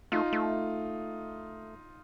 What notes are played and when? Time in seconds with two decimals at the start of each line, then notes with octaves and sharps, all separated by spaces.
0.12 A3 D#4 F4
0.32 A3